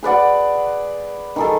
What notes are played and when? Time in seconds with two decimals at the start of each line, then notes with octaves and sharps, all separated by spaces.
0.03 G#4 B4 D5 F#5
1.36 D#3 G#4 A4